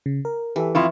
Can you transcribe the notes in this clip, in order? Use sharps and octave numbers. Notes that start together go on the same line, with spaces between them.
C#3
A#4
E3 G4 A4 E5
F2 E4 F4 C6 C#6